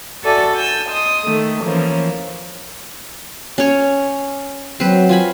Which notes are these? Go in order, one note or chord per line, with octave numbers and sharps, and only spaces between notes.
F#4 A4 D5 E5 G#5
G#5 E6 G6
D#5 C6 D#6
D#3 A3
E3 F3 A#3 C#4
C#4 C#5
F#3 C4 B4
F4 G#5 B5